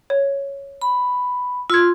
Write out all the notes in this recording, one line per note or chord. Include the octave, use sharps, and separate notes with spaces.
C#5
B5
F4 C6 E6 G#6